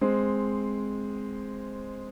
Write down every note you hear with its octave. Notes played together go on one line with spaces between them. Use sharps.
G#3 C4